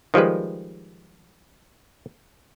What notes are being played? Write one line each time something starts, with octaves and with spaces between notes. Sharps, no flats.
D#3 F3 G3 G#3 B4